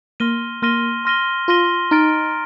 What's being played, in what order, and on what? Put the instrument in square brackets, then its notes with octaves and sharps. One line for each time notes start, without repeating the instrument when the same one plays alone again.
[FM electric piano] A#3 [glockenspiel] C6 F6 A#6 D#7 G7
[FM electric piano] A#3 [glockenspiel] C6 F6 A#6 D#7 G7
[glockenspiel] C6 F6 A#6 D#7 G7
[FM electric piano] F4 [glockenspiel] C6 F6 A#6 D#7 G7
[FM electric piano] D#4 [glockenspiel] A#5 F6 A6 D7